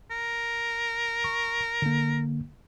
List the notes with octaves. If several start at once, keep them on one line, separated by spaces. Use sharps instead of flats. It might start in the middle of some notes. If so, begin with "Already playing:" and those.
A#4
C#6
D3 A#3